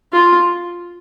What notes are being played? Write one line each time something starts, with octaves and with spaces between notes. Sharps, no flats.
F4